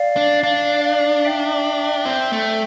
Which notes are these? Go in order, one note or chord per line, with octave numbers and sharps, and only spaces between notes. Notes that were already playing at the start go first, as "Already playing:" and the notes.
Already playing: D5 F5
D4
D4 D5 F5
D5 F5
E5 G5
C4
A3